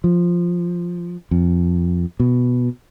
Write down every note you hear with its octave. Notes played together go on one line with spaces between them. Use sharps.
F3
F2
B2